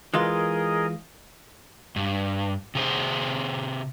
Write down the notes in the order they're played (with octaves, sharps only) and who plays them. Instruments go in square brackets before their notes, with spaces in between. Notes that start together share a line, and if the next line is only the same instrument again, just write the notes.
[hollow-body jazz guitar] E3 G#3 F4 [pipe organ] G#4 A#4 D#5
[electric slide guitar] G2
C3 G#4 C5